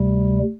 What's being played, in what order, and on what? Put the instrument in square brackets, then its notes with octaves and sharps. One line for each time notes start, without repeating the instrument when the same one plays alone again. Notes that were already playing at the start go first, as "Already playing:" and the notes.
Already playing: [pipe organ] D2 C3 G3